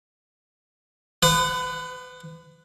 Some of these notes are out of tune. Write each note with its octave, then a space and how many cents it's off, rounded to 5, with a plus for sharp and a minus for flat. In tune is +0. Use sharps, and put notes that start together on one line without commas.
B4 +35 F#5 +0 D#6 -40